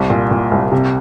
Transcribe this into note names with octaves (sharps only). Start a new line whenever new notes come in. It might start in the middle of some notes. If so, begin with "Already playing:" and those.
Already playing: C2
A#2
A#2
C2
C3